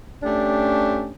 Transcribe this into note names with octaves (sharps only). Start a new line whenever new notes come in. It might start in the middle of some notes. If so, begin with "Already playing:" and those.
A3 C#4 D4 G4